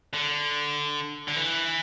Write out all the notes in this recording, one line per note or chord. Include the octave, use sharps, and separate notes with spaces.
D3
D3
E3